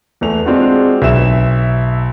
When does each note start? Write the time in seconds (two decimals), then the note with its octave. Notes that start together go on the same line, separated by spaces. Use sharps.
0.21 E2 A3 F7
0.46 G#3 C4 D4 F4 F#4
1.02 B1 E5 E7